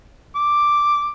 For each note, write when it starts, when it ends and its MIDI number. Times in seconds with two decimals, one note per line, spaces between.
0.35 1.10 86